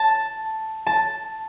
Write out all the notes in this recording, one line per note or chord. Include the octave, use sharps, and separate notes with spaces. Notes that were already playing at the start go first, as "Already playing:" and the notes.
Already playing: A5
A5